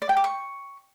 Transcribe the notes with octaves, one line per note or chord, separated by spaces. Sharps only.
D5
G5
D6
C#6